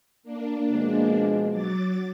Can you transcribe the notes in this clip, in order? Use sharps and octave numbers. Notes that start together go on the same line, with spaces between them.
A#3 D4
B2 F3 G#3
F#3 D6 A6